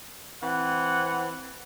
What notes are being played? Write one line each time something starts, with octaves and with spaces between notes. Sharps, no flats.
E3 C4 F#5